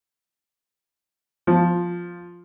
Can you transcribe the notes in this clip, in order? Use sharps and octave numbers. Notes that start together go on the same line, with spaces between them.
F3